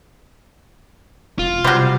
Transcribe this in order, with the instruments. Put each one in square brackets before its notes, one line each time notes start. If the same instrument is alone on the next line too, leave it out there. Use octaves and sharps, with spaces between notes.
[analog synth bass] F1 [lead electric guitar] F4
[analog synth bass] C3 [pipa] F#3 C5 [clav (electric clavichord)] G3